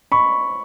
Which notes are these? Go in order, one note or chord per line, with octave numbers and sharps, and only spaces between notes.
B5 C#6